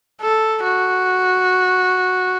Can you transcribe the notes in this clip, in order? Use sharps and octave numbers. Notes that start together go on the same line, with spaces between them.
A4
F#4